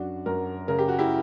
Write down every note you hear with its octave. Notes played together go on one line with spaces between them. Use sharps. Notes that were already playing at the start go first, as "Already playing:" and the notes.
Already playing: F#2 D4 F#4
F#2 F#4 A#4
C#3 A#4
G4
F#4
E4 G4